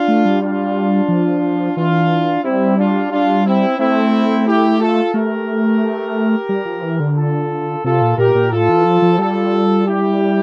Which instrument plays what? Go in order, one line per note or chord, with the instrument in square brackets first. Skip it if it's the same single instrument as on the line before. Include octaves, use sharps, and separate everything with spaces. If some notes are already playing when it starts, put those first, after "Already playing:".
Already playing: [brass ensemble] D4 F4
[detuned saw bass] A3
G3
[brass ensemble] D4 F4
[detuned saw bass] F3
[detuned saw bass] E3 [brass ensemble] D4 F4
[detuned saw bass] G3 [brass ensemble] C4 E4
[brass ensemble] D4 F4
D4 F4
C4 E4
[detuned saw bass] A3 [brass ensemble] C4 E4
[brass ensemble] E4 G4
F4 A4
[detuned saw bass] A3 [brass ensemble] G4 A#4
[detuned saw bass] G3
F3
E3
D3
[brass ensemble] F4 A4
[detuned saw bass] C3 [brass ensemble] F4 A4
[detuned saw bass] A#2
[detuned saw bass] A#2 [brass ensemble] G4 A#4
[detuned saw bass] A#2
[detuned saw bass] A2 [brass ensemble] F4 A4
[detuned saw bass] E3
F3
F3
[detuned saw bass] G3 [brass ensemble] F4 A4
[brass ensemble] E4 G4